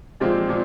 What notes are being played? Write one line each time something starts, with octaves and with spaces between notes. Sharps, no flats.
A#2 F3 G#3 C4 G4
A#2 F3